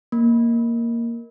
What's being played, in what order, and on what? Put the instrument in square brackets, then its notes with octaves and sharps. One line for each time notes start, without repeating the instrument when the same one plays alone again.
[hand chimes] A#3